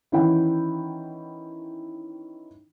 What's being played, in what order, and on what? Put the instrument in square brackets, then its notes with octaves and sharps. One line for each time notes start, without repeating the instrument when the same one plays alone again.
[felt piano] D#3 E3 C#4 E4 F#5 G5